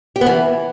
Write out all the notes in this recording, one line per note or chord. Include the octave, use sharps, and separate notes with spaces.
G4
B3
E3